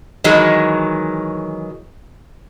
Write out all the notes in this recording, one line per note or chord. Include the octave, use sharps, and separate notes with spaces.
D#3 E3 F#3 G#3